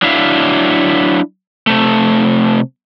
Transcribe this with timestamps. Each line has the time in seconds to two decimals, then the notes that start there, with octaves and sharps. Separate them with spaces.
0.02 F#3 D4 E4 E5 F5
1.67 C3 A3